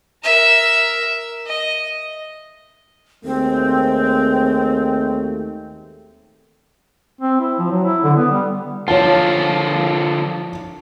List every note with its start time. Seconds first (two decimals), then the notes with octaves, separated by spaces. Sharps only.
0.24 A#4 E5
1.46 D#5
3.24 D#2 G#3 A3 C4
7.21 C4
7.40 E4
7.59 F3
7.71 F#3
7.85 E4
8.04 D3
8.17 B3
8.31 G3
8.88 D3 F3 F4 C#5 A5